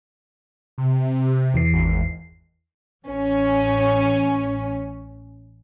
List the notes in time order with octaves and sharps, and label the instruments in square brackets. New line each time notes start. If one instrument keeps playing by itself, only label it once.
[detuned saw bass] C3
[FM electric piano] E2 E3 C7
[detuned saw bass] G#1
[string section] A1 C#4